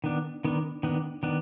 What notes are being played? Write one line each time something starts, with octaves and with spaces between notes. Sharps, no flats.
D#3 B3 D4
D#3 B3 D4
D#3 B3 D4
D#3 B3 D4